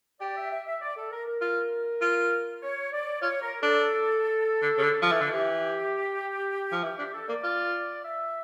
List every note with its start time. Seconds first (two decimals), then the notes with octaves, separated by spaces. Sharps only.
0.21 G4 D5
0.37 E5
0.52 E5
0.67 E5
0.81 D5
0.97 A4
1.11 A#4
1.27 A#4
1.42 F4
2.01 F4
2.62 C#5
2.93 D5
3.22 F4 C#5
3.43 A#4
3.62 D4 A4
4.62 D3
4.78 C#3
4.83 D3
5.02 F3 A4
5.12 E3
5.21 D3
5.30 E3 G4
6.72 F3
6.83 E3 G4
6.98 D4 G4
7.14 A4
7.29 A#3 D5
7.43 F4
8.04 E5